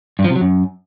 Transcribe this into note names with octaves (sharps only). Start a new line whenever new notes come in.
G2
F3
C3
F#3
F#2